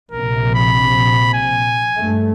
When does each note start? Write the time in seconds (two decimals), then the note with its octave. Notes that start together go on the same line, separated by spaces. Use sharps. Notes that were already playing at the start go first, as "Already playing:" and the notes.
0.12 A#1 C3 A#4
0.55 B5
1.34 G#5
1.97 G2 A3